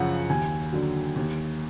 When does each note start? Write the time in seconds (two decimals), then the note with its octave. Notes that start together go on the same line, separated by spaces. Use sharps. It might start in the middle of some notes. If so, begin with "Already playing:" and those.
Already playing: F#2 C#3 F3 F#5
0.30 D#2 G#5
0.73 D3 F#3
1.16 D#2